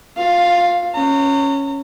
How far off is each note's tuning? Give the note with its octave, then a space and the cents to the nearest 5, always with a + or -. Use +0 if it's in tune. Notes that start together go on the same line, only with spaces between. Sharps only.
F4 +20 F5 +0
C#4 +0 A#5 -35